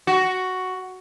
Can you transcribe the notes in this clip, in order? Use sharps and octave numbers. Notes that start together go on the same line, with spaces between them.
F#4